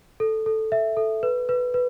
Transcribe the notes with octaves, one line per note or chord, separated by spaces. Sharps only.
A4
A4
E5
A4
B4
B4
B4